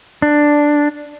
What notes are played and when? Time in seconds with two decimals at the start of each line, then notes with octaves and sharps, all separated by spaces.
0.22 D4